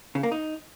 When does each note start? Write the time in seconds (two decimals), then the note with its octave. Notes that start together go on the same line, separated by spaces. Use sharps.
0.15 C#3
0.23 A#3
0.32 D#4